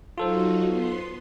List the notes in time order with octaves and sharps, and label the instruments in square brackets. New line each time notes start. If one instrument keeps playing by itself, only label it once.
[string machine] F#3 D#4 F#4 [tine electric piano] F4 A4 C5
[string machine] B3 C6